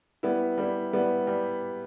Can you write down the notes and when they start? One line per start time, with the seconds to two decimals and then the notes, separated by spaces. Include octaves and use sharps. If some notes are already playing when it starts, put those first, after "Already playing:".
0.23 G3 B3 E4
0.58 G3 B3 E4
0.93 G3 B3 E4
1.27 G3